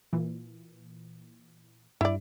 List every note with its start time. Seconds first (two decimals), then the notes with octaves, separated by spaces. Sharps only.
0.13 A#2 E3
2.01 G2 E4 D5